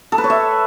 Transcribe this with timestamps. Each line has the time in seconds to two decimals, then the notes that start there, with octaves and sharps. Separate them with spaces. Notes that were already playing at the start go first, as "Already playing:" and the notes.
0.12 A4
0.18 B4
0.24 C#5
0.30 E5